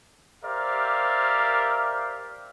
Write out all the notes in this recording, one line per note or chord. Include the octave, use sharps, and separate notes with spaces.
G4 A#4 C5 D5 E5 F5